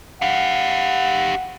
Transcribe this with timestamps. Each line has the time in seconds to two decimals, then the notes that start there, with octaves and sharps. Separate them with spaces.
0.22 G4 F5 F#5